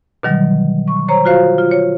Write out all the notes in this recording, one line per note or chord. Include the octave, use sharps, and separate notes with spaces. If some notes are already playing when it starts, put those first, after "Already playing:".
B2 D3 D#3 F#3 G3
C#6
C5 C#5 A#5
F4 F#4 C5 F5
F4
C#5